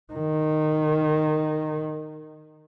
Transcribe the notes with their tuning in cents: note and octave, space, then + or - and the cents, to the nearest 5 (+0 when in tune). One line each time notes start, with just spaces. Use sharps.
D#3 -10